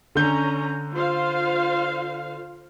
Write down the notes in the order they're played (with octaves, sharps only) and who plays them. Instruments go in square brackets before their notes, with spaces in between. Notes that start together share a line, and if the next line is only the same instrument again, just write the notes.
[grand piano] D3 G6 [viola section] C#4 A#5
[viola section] F4 C5 F5